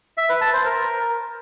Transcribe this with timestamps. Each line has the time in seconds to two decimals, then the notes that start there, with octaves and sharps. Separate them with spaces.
0.18 E5
0.29 B4
0.41 A5
0.53 C5
0.65 A#4